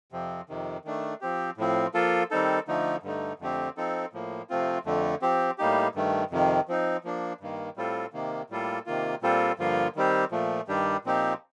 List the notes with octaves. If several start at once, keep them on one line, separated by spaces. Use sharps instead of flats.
F2 C3 F3 C4
F2 C3 D#3
D#3 A3 D4
F3 C4 G4
A2 F3 C4
F3 A#3 F4 A4
D#3 G3 C4 D#4 A4
D3 F3 A3 D#4
G2 D3 A3 D#4
F2 D3 A3 C4 G4
F3 C4 D#4 A4
A2 F3 A#3
C3 F3 A3 C4 F4
F2 D3 A3
F3 C4 G4
A2 G3 A#3 D#4 G4
G2 D#3 A3
F2 C3 D#3
F3 C4 D#4
F3 A#3 D4
G2 D#3 A#3
A2 G3 C4 F4 A4
C3 D#3 A#3
A2 G3 A#3 F4 A4
C3 D#3 A#3 F4
A#2 G3 C4 F4 A4
G2 D3 F3 A#3 F4
D#3 G3 C4 G4
A#2 F3 A3
G2 D#3 G3 D4 G4
A#2 F3 C4 D#4 G4